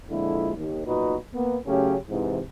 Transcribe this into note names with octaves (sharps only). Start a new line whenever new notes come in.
F2 A#2 D3 G#3 E4
D#2
B1 A#2 D#4 F#4 B4
A#3 B3
C#3 F#3 A3 C#4 G4
G#2 C3 E3